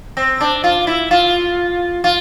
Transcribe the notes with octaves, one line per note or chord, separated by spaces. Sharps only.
C4
D4
F4
E4
F4
F4